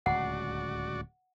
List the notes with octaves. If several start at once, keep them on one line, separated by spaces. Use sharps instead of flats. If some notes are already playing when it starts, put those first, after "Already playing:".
D1 C#2 F#4 D5 F#5